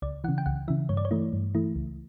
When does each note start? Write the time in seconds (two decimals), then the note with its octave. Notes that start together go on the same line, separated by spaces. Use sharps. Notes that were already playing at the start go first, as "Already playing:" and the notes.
0.02 C#2 D5
0.24 C#3 E3 F#5
0.38 G5
0.46 C#2 F#5
0.68 C#3 E3 E5
0.89 G2 C#5
0.97 D5
1.05 C#5
1.11 E3 A3 E4
1.33 G2
1.55 E3 A3 E4
1.76 C#2